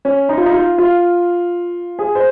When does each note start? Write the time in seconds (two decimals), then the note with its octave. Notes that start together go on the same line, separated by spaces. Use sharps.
0.05 C#4
0.29 D#4
0.37 F4
0.46 D#4
0.53 F4
0.78 F4
1.99 G#4
2.15 C5